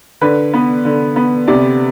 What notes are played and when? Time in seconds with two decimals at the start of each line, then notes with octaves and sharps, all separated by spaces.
0.21 D3 B4
0.54 B3
0.85 D3
1.16 B3
1.48 C3 D5